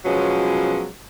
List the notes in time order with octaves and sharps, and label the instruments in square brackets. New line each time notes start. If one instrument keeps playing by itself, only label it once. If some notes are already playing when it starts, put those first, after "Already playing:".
[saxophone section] B2 F3 F#3 G#3 B3 C#4